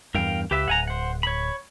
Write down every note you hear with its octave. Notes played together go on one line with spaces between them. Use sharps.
E2 G2 A#4 F5 G5
C#2 G4 B4 E5
D1 F#5 G#5 A#5
C5 F#5
C#5 B5